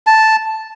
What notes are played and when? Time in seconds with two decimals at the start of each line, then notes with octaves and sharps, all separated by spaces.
0.07 A5